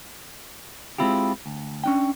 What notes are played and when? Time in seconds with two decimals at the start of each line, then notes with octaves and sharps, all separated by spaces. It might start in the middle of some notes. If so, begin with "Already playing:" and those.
0.98 G#3 A#3 C4 E4 F4 G4
1.46 D2
1.84 C#4 D4 G5